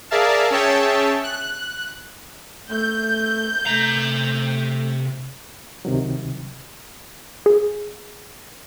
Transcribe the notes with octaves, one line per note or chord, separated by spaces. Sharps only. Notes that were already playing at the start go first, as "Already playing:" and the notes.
G#4 A#4 D5 E5 F5 A5
C#4 G#4 C#5 E5 G5 A5
F#6
A3 G6
C3 A3 A#5
C#2 C3 D#3 F#3
G#4